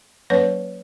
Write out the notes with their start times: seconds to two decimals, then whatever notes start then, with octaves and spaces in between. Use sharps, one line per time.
0.30 F#3 A#3 C#4 B4 C#5